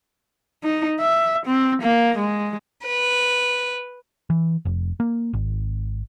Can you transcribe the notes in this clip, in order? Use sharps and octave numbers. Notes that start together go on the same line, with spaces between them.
D#4
E5
C4
A#3
G#3
B4
E3
F1
A#3
G#1